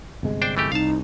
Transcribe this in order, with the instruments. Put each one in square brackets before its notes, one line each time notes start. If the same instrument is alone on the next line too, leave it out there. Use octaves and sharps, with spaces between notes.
[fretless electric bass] G1 C3 G#3
[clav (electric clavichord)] D4 C5 G5
E3 A3 G4
[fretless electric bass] C2 [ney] D#4 [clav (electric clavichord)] F5 A5